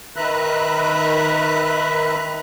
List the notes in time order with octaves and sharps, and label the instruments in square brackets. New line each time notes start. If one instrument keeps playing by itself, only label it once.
[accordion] D#3 B4 E5 A#5 F#6